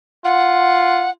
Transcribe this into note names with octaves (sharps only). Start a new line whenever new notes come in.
F4 F#5